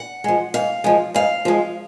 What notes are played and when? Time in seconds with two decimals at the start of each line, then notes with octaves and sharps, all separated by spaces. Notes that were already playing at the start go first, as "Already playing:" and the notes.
Already playing: F#5
0.24 F3 G#3
0.54 G#2 F5
0.84 F3 G#3
1.14 G#2 F5
1.45 F3 G#3